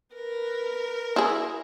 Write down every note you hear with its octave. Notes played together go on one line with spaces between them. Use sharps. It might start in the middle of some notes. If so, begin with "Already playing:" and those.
A#4 B4
E4 G#4